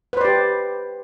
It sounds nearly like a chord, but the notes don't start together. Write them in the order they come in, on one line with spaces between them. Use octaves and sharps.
B4 C5 D5 G4